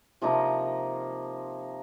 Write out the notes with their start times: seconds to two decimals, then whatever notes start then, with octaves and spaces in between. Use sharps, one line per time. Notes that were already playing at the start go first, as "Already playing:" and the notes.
0.21 C3 F3 A#3 D#4